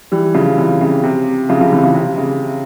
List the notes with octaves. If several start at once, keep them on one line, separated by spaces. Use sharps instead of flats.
E3 G3
C#3 F3
C3 E3
C#3
C3
C#3 F3
C#3 F3
C3 E3
C#3
C3
C#3